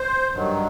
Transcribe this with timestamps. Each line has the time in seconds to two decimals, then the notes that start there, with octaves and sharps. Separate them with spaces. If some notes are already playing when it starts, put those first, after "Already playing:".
Already playing: C5
0.33 G2 D#3 F#3